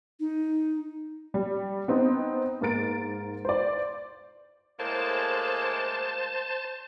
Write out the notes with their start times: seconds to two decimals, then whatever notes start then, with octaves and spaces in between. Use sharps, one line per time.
0.19 D#4
1.34 G3
1.88 B3 C4 D#4
2.61 G#2 A#3 A#4 A6 D7
3.45 C5 D5
4.80 A2 G#3 A#3 C5 A5